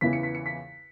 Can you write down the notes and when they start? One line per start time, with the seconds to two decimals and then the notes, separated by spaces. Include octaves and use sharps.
0.01 E2 C#3 E3 B3 B6
0.13 C#7
0.23 B6
0.35 C#7
0.46 B6